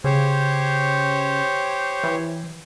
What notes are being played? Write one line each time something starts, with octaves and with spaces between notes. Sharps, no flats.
C#3 G4 C5 C#5
E3